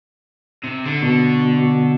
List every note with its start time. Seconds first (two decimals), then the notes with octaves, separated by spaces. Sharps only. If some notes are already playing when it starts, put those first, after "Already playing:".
0.64 C3
0.86 D3
1.02 B2